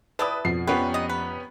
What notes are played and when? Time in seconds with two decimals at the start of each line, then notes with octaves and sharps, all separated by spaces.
0.19 E4 G4 A4 B4 D5 D#6
0.45 F2 B2 F3 C7
0.67 F1 F3 B3 C#4 G4 B4
0.94 B2 D#5
1.09 B4